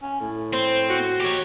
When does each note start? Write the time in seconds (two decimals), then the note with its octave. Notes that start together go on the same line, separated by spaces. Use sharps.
0.02 C#4
0.21 A2
0.53 C4 C5
0.90 F#4
1.20 G4 C#5